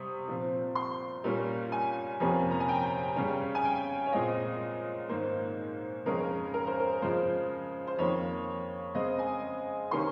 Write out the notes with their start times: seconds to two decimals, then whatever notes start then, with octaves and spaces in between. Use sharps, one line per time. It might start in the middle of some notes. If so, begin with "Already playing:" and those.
Already playing: C3 G3 C4 C#6 D#6
0.28 A#2 F3 C4
0.75 C6
1.24 A#2 G3 A#3 C#4
1.72 G#5
2.20 F2 C3 F3 A#3 C#4
2.51 A#5
2.60 G#5
2.69 G5
3.16 C#3 G3 C#4
3.55 G#5
3.65 G5
4.06 C#5
4.13 A#2 G#3 C4 D#5
5.09 G#2 D#3 A#3 C5
6.05 F2 C#3 G#3 C#4 A#4
6.54 A#4
6.67 C5
6.80 A#4
7.02 C#3 F3 G#3 C5
7.87 C5
7.98 F2 D#3 A#3 C#5
8.95 C#3 G#3 C4 D#5
9.19 G#5
9.91 C3 D#3 A#3 C#4 C6